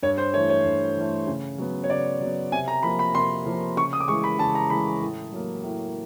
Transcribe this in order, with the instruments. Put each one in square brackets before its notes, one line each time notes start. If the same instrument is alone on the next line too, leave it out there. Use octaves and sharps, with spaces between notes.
[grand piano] G2 C#5
C5
E3 A3 C#5
C#5
G2
E3 A3
C#3
F#3 B3
C#5
C#3 D5
F#3 B3
C3 G#5
A#5
F3 A#3 B5
B5
C3 C6
F3 A#3
C#3 C#6
D#6
D6
E3 G#3 C#6
B5
C#3 A5
A#5
E3 G#3 B5
A2
F#3 A#3
A2